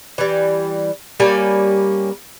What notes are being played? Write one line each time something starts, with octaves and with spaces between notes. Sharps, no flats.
E3 G3
G3 A#3 C#4 G#5